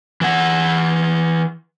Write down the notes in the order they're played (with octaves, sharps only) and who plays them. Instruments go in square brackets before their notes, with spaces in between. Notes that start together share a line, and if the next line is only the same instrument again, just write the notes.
[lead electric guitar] E3 F#5